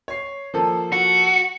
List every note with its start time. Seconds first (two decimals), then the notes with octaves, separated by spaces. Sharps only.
0.08 C#5 C7
0.54 F3 A#3 A4
0.93 F#4